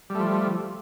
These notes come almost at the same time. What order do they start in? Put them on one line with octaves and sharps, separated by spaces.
G3 A3 F3